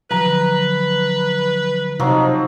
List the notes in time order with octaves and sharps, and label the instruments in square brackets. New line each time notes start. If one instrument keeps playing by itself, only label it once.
[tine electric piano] D3 F3 F#3 [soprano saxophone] B4 [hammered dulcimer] A#5
[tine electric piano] C3 [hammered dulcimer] F3 F#3 [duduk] D#4